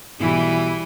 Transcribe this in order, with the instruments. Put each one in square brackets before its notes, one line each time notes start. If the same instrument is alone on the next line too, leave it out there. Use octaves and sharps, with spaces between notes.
[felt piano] B1 B2 [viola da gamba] E3 G3 E4